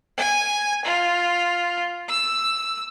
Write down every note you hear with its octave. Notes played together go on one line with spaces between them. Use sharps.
G#5
F4
E6